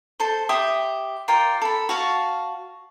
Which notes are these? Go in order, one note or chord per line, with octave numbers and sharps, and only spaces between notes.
A4 C5
G4 E5 C6 D#6
F4 A#4 D5 G5
A4 B5
F#4 F5 A5